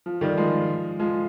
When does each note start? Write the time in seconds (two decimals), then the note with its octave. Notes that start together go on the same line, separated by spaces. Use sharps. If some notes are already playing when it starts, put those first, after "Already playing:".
0.06 F3
0.21 D#3 G3
0.37 F3 G#3
1.00 F3 G#3